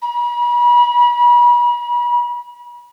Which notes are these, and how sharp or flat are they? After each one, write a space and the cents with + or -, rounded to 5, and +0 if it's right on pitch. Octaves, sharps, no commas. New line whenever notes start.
B5 -40